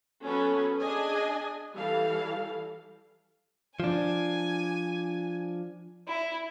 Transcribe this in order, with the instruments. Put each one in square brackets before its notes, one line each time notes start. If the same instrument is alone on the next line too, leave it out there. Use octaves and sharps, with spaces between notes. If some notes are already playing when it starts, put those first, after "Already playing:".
[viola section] F#3 B3 C#4 A4 B4
D4 G#4 D#5 G#5
E3 G3 A4 F5
[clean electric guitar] F3 D4 [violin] G#5
[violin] E4